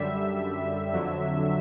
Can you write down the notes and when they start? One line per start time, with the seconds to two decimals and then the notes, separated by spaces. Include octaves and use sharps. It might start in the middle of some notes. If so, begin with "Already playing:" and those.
Already playing: F#2 D3 G3 E5
0.93 F2 D3 F#3